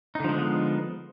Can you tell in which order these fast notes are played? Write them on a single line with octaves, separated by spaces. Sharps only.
D#4 D3 F3 G#3 B3